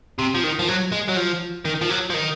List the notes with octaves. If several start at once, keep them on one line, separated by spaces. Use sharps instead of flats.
C3
F3
D#3
F3
F#3
G#3
F#3
F3
D#3
F3
F#3
F3
D#3